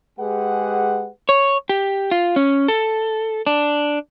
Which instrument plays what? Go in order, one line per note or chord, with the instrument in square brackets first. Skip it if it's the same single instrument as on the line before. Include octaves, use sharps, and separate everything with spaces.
[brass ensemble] G#3 G4 G#4 B4 F#5
[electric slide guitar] C#5
G4
F4
C#4
A4
D4